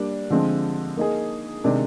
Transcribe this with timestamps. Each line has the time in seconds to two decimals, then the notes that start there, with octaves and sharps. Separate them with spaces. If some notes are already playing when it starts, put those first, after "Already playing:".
Already playing: G3 A#3 D4
0.30 D3 F3 G#3 C4
0.97 A#3 D#4 G#4
1.64 C3 D#3 G#3 D4 G4